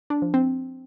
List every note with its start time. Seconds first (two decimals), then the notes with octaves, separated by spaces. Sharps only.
0.10 D4
0.22 F3
0.34 C4